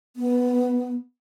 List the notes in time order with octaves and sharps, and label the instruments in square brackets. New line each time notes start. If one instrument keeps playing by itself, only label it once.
[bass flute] B3